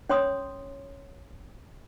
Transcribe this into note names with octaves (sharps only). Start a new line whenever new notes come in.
C#4 C#5 C6 D#6 E6